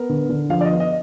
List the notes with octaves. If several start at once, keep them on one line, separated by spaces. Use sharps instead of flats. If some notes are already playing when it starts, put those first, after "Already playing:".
Already playing: B3 A#4
D3
D3
F3 F5
D5
B3 D#5
D#5